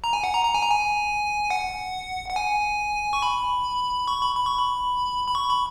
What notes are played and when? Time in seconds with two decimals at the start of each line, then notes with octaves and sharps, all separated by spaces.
0.04 A#5
0.13 G#5
0.24 F#5
0.34 A#5
0.45 A#5
0.54 G#5
0.63 A#5
0.71 G#5
1.50 F#5
2.29 F#5
2.36 G#5
3.13 C#6
3.22 B5
4.08 C#6
4.22 B5
4.36 B5
4.46 C#6
4.58 B5
5.28 B5
5.35 C#6
5.50 B5